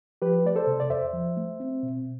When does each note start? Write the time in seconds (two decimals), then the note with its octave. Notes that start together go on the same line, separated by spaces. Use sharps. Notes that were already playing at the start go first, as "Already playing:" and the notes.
0.22 F3 G4 B4
0.45 A3 D5
0.56 A4 C5
0.67 C3
0.80 D5
0.90 E2 C5 E5
1.13 F3
1.37 A3
1.60 C4
1.83 B2